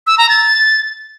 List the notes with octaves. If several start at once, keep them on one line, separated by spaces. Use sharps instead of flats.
E6
A#5
A6